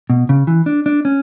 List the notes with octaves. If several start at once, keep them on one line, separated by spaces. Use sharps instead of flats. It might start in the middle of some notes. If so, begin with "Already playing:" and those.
B2
C#3
E3
D4
D4
C#4